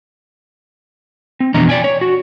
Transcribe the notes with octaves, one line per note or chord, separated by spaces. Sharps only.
C4
F2 B2 E3 D4 D#5 A#5
D5 G5 G#5
C#5
F#4